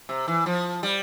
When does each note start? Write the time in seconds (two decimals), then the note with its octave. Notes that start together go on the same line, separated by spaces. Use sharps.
0.09 C3
0.28 E3
0.46 F3
0.83 G3